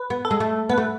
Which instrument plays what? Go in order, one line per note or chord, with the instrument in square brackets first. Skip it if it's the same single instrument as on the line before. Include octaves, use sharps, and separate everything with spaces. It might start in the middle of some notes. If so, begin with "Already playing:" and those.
Already playing: [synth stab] B4
[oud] B3
[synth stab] A4
[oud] G#3
A3
[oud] B3 [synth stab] B4
[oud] A3